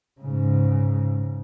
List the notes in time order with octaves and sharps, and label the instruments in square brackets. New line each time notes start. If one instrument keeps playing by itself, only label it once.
[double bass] G#2 C#3